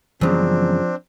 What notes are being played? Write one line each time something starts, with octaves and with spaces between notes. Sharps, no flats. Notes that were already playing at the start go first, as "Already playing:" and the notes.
F#2 C#3 E3 F3 G3 B3 C4 D4